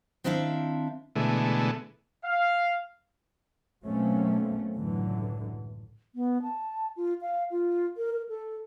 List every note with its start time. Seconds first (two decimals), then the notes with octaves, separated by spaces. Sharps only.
0.24 D#3 C4 D4 E4 E5 F5
1.16 B2 D3 E3 G#3 A3
2.24 F5
3.85 B2 F#3 A3 A#3 C4 C#4
4.76 C#2 F#2 A2 D3 E3 F#3
6.15 B3
6.42 A5
6.97 F4
7.21 F5
7.51 F4
7.97 A#4
8.13 A#4
8.29 A4